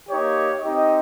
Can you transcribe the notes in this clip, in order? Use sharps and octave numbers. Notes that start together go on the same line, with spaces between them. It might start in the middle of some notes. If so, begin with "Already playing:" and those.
A#3 D#4 G4 C#5
C4 D#4 G4 D#5